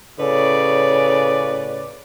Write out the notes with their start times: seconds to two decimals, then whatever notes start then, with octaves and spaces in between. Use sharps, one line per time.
0.19 A2 C#3 B4 C#5 D5